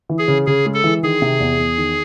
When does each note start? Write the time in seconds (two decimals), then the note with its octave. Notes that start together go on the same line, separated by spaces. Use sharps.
0.10 E3
0.18 G#4
0.28 C#3
0.47 C#3 G#4
0.65 G#3
0.74 A4
0.84 E3
1.03 D#3 G#4
1.22 C3
1.40 E2
1.59 E2
1.78 D#3